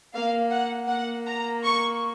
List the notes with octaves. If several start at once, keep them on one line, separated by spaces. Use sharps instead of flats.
A#3 F5
F#5
A#3 F#5
A#5
C#6